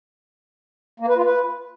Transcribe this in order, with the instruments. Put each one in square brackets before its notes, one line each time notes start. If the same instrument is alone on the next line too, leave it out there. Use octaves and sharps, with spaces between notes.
[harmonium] A#3
B4
F4
B4